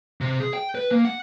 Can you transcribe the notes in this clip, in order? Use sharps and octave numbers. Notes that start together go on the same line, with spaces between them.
C3
G#4
G5
B4
A#3
F#5